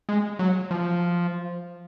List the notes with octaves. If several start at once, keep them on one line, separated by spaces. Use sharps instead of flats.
G#3
F#3
F3